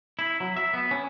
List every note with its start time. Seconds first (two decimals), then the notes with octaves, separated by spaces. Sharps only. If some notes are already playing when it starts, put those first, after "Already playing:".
0.19 E4
0.40 F#3
0.56 E5
0.74 B3
0.91 C#4